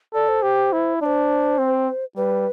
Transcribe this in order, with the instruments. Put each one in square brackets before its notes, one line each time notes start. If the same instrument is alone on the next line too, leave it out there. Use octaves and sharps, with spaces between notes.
[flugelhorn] A4 [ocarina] D5
[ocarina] C5
[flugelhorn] G4
E4
[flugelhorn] D4 [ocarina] C5 D5
[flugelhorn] C4
[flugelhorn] G3 [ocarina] B4